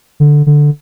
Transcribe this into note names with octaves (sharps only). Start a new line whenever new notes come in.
D3
D3